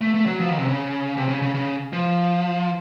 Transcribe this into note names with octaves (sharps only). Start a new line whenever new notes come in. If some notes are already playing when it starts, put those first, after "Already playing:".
A3
A3
F#3
F3
D#3
C3
C#3
C3
C#3
C#3
C#3
F3